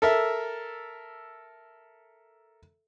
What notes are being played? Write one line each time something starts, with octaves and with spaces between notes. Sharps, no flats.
A4 A#4 E5